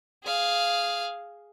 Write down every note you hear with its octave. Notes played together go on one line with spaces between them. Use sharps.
G#4 F5